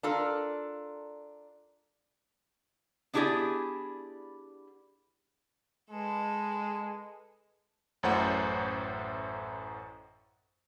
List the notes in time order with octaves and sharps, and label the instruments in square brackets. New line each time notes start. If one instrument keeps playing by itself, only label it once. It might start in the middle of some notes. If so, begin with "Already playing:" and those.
[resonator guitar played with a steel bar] D4 F4 A4 A#4
B3 D4 E4 G4 G#4 D5
[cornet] G#3 [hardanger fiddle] A4 B4
[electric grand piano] A1 F#2 A2 C5 F#5